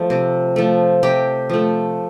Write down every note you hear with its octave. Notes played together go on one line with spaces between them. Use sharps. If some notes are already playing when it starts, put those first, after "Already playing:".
Already playing: F3 A3
C3
F3 A3
C3 G4
F3 A3